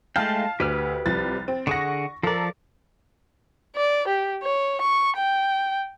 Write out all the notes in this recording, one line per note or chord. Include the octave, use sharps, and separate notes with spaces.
G#3 A3 F5 G5 A5 F6
D2 G4 B4 F6
C2 F3 A6
C4
D3 G#4 F#5 C#6 A#6
F3 A4 A#4 D5
D5
G4
C#5
C#6
G5